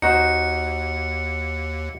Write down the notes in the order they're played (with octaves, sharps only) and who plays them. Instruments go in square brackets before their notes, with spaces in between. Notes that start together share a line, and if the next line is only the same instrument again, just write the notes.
[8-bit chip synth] D#2 [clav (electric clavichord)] D#4 F#4 C5 [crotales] C#7